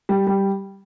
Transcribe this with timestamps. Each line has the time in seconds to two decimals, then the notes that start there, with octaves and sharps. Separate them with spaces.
0.09 G3
0.27 G3